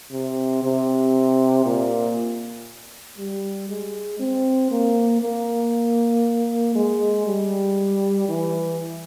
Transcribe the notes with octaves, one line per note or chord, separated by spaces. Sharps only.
C3
C3
A#2
G3
G#3
C4
A#3
A#3
G#3
G3
E3